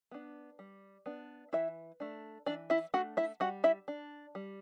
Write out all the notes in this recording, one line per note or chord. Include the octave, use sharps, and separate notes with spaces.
B3 D4
G3
B3 D4
E3 E4 E5
A3 D4
E3 D4 D5
E4 E5
A3 D4 F#4 F#5
E4 E5
G3 F#4 F#5
E4 E5
D4
G3